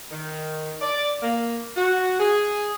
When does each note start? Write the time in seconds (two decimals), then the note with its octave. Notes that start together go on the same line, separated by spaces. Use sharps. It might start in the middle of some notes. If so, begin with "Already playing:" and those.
0.11 D#3
0.81 D5
1.22 A#3
1.76 F#4
2.20 G#4